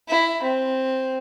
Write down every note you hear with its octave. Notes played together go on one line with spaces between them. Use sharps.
E4
C4